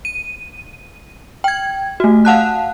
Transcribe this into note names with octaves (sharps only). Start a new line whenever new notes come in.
D#7
G5 G#6
A3 F#4
F5 F#5 A5 F#6